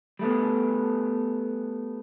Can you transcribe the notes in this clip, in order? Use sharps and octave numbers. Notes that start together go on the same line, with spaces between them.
G3 A3 B3